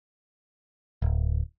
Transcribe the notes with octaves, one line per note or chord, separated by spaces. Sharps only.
D1